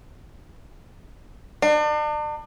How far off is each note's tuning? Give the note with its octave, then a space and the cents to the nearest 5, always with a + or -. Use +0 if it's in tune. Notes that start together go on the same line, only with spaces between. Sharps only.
D4 +40